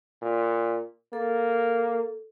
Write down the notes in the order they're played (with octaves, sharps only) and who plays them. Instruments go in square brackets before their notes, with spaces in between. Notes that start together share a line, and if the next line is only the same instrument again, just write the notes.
[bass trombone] A#2
[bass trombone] A#3 [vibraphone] A4